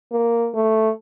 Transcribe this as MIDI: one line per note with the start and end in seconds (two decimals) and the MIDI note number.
0.12 0.49 58
0.54 0.90 57